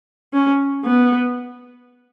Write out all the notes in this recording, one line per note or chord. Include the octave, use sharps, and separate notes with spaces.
C#4
B3